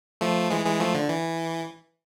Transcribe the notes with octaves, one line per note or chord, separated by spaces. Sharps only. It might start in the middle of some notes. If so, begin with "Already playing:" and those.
F3 A3
E3 G#3
E3 G#3
F3 A3
D3
E3